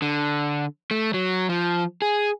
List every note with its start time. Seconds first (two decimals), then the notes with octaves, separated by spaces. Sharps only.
0.02 D3
0.91 A3
1.14 F#3
1.49 F3
2.02 G#4